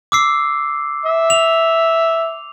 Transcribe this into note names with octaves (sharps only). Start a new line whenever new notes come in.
D6 E6 C7
E5
F7